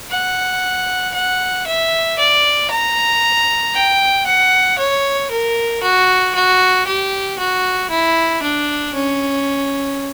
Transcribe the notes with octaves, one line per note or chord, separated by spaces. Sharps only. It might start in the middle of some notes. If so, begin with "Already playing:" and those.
F#5
F#5
E5
D5
A#5
G5
F#5
C#5
A#4
F#4
F#4
G4
F#4
E4
D4
C#4